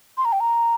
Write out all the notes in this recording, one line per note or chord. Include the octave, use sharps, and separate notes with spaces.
C6
A#5
G5
A#5